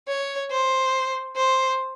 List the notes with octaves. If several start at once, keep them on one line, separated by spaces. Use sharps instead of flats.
C#5
C5
C5